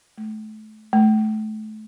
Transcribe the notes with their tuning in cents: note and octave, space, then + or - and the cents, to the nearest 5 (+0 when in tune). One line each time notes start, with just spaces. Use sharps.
A3 -30
A3 -30